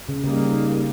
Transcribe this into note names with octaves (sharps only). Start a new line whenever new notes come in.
C#3
C#3 G3 A#3 D#4